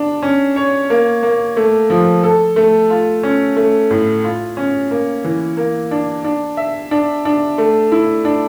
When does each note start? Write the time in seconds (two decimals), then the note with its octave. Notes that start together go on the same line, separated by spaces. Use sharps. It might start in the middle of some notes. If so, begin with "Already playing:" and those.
Already playing: D4
0.23 C#4
0.56 C#5
0.90 A#3
1.23 A#3
1.57 A3
1.90 F3
2.23 A4
2.56 A3
2.90 F4
3.23 C#4
3.56 A3
3.91 A2
4.24 F4
4.57 C#4
4.91 A#3
5.24 E3
5.57 A#3
5.91 D4
6.24 D4
6.57 E5
6.91 D4
7.25 D4
7.58 A3
7.92 E4
8.25 D4